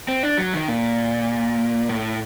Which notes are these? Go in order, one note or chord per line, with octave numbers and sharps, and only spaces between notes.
C4
D4
F#3
D#3
A#2
A2